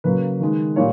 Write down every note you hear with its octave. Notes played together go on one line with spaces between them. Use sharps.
C#3 F#3 A#3 B4
D#3 G#3
A#2 G3 C#5